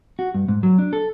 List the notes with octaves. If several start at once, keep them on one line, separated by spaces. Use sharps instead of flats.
F#4
G2
G#2
F#3
D4
A4